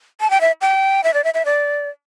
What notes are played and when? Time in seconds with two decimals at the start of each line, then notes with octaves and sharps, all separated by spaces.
0.21 A5
0.30 G5
0.41 E5
0.61 G5
1.04 E5
1.14 D5
1.24 E5
1.34 E5
1.45 D5